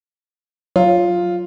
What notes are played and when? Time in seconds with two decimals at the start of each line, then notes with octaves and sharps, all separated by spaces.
0.76 F#3 F4